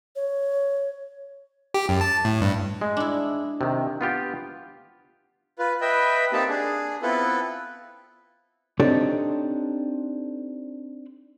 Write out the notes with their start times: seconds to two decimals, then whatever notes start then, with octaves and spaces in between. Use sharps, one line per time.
0.16 C#5
1.74 G4
1.89 F#2
2.01 A5
2.24 A2
2.41 G2
2.81 G#3
2.97 D4 E4
3.61 C3 D#3
4.01 B3 F4 G4
5.59 F4 B4
5.81 B4 D#5 E5 G5
6.32 A#3 C4 D#4 G4 A5
6.49 D4 G#4
7.02 B3 C4 E4 F4 A4 B4
8.80 C4 D4 D#4 G4 A4 C#5